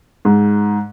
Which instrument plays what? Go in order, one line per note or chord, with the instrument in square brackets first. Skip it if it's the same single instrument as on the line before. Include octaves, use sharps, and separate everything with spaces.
[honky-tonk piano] G#2